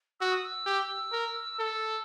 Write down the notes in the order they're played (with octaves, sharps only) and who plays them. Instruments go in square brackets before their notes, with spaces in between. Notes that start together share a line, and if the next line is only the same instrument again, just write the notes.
[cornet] F#4 [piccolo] E6
[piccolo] D#6
E6
[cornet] G4
A#4
A4